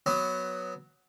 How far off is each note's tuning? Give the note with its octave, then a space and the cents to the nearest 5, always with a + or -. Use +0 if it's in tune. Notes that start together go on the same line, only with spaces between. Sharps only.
F#3 +0 B3 +5